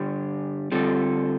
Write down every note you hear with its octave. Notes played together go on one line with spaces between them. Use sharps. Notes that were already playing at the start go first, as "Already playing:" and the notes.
Already playing: G2 D3 G3
D3 G3 C4 F4 A4